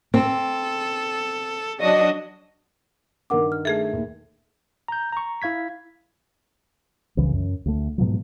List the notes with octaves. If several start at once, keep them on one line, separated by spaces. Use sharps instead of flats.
C4 A4
F#3 D4 F#4 D#5
G2 D#3 A#4 F#5 D6
F6
A3 G#4 A4 E5
D#2
A#5 G6
A#5 C#6
E4 F5 G#6 B6
C2 C#3 E3
F#2
D2 A3
G#2 B2 F3 F#3